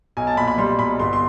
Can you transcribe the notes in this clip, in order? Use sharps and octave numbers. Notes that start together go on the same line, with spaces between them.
B1 G#5
A5
A#2 B5
B5
G3 C6
B1 B5
G1 C6
C6